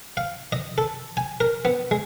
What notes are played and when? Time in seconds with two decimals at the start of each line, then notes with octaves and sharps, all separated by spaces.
0.17 F5
0.52 D#5
0.78 A4
1.17 G#5
1.40 A#4
1.65 B3
1.91 G#3